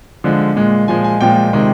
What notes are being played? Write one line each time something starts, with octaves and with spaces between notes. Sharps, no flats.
D3 F3 G#3
A#2 G#3
A#2 F3 G#3 G#5
G#5
A#2 F3 G#3 G5
C3 D#3 G#3